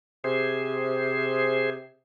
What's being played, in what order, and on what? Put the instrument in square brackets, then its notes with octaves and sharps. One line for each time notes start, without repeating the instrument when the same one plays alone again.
[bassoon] C3 [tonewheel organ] G#4 C5